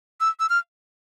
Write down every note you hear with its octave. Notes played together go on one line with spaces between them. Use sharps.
E6
E6
F6